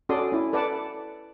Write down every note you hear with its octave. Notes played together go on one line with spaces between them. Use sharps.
C#4 F#4 A4 D5 C6 D#6
C#4 E4
A4 B4 D5 F#5 A5